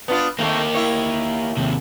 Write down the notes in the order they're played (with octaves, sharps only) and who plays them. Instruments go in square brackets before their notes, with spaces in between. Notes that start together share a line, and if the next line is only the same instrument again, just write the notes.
[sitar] B3 D4 F4
[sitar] D#3 A3 C4 [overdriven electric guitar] A#3 G4
[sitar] E4 C#5
[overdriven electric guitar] D#2 C3